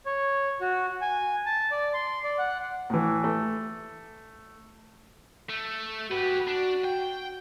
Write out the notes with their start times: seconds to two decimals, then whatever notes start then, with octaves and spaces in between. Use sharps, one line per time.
0.06 C#5
0.61 F#4
1.01 G#5
1.46 A5
1.71 D5
1.94 C6
2.24 D5
2.38 F#5
2.90 A2 E3
3.24 A3
5.50 A3
6.11 F#4 G4 B4
6.47 D4
6.84 G5